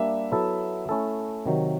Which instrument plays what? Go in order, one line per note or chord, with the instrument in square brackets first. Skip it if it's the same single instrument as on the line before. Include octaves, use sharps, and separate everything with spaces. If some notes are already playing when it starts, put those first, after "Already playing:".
Already playing: [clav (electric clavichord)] G3 A#3 D4 [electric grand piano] E5
[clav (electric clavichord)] F#3 B3 E4 A4
A3 C#4 E4 A4
C3 D#3 F#3